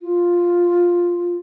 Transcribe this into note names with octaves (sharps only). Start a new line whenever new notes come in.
F4